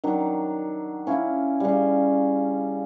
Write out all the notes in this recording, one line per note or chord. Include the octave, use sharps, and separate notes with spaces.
D#3 F#3 D4
C#4 E4 F5
C#3 G3